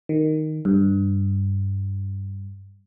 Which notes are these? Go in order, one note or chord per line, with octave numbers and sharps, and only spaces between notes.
D#3
G2